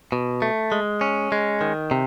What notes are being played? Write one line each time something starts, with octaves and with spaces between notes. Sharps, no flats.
B2
A3
G#3
C#4
G#3
D#3
C3